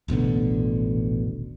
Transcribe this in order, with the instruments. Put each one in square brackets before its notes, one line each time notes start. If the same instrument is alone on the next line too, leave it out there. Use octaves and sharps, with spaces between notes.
[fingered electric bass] D#1 A1 B2 D3